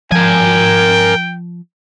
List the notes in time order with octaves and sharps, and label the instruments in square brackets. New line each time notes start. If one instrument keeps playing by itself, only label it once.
[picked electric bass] F3 [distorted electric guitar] A#4 G#5 [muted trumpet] G5